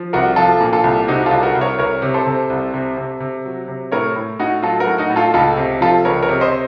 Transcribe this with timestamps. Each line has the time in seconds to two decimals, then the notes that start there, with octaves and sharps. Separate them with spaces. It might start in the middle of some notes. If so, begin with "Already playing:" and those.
Already playing: F3
0.13 C2 F#4 A#4
0.36 F3 F4 A4
0.61 A#2
0.73 F4 A4
0.84 C2
1.08 C3 D#4 F#4
1.26 C2 F4 A4
1.43 F#4 A#4
1.55 C2
1.61 A#4 C#5
1.78 C2 A#4 C#5
2.02 C3
2.14 A4 C5
2.27 C3
2.50 C2
2.74 C3
2.97 C3
3.20 C3
3.45 F#3
3.68 C3
3.92 A2 A#4 C#5
4.16 A2
4.39 A2 D#4 F#4
4.62 F#3 F4 A4
4.80 F#4 A#4
4.87 A2
4.98 D#4 F#4
5.10 A2
5.16 F4 A4
5.34 C#2 F4 A4
5.57 C3
5.81 F3 F4 A4
6.05 C#2 A#4 C#5
6.22 A#4 C#5
6.29 C3
6.41 C5 D#5